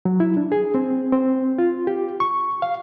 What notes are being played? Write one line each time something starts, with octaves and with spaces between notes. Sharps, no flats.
F#3
E4
D4
G#4
C4
C4
F4
G4
C#6
F5